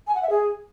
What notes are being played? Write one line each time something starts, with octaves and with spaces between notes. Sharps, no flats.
G#5
F#5
E5
G#4